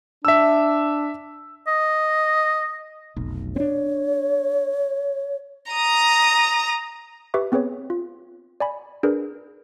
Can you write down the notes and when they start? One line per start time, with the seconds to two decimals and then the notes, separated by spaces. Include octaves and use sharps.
0.25 D4 E5 E6
1.67 D#5
3.16 F1 B1
3.56 C4 D4 C#5
5.72 A#5 D#6
7.34 G4 B4 E5 C#6 D6
7.52 B3 C4 G#4 B4 C#5
7.90 F4
8.60 D5 G#5 B5
9.03 D4 G#4 A#4 B4 D5